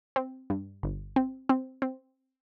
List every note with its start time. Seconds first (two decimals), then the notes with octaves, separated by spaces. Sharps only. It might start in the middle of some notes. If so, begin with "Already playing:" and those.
0.16 C4
0.50 G2
0.83 G1
1.16 C4
1.49 C4
1.82 C4